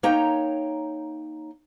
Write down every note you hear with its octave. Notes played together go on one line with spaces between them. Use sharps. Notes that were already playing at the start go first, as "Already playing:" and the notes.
A#3 D#4 C#5 G5 A#5